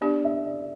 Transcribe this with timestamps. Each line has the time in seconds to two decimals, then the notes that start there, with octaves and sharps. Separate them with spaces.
0.01 B3 D4 G4 D5
0.24 E5
0.46 D5